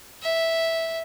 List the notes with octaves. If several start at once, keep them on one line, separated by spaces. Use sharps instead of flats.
E5